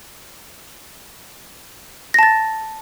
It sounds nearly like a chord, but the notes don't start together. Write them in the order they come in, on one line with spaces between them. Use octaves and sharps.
A#6 A5 A6